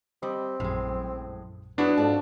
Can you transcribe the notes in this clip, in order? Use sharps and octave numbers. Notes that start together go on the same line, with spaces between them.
G3 C4 D#5
A#1 F#2 A2 G#3
F#3 B3 D4 E4 F#4 G#4
F2 G#2 D5 A5